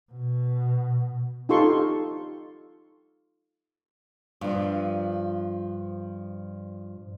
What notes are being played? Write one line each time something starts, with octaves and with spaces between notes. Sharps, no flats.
B2
D#4 F4 G4 A4 C6 C#6
G2 F3